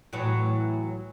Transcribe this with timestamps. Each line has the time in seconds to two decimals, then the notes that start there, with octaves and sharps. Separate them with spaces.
0.13 A2 E3 F#3